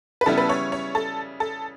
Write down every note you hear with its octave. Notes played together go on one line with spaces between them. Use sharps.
B4
C#3 G3 B3 E4 A4
B4
C#5
C#5
A4
A4